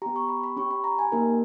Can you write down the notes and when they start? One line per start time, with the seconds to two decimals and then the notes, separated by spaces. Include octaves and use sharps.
0.02 G4 A#5
0.06 B3
0.16 C#6
0.29 B5
0.44 B5
0.56 C#4 G4 C#6
0.71 B5
0.84 A#5
0.99 G#5
1.12 A#3 D#4 G4 A#4